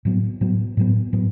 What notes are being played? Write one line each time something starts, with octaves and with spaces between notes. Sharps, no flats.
A2 F#3 B3
A2 F#3 B3
A2 F#3 B3
A2 F#3 B3